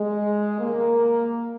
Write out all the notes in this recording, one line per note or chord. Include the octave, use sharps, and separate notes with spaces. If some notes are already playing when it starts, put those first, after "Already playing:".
Already playing: G#3
D#2 C#3 G3 A#3